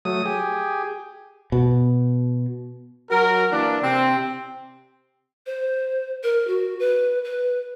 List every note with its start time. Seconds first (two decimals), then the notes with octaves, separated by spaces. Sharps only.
0.05 F#3 A3 D#6
0.26 G4 G#4
1.52 B2
3.10 F#3 F#4 A#4
3.52 E3 A#3 D4
3.82 C3 C4
5.46 C5
6.23 A#4
6.47 F#4
6.79 B4
7.24 B4